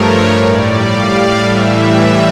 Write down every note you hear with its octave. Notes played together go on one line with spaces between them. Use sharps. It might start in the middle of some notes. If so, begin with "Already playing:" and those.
Already playing: G2 F3 A3 A#4 C#5
A2 G3 D5
F5
A2 E3 G3 E5